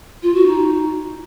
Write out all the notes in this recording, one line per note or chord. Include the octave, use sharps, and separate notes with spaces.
F4
F#4
D#4